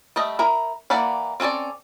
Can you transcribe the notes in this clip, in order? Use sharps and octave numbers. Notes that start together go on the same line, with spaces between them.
G3 A3 D#5
E4 A#4
E3 A#3 D5 F#5 B5
C4 C#4 F4 A4 D5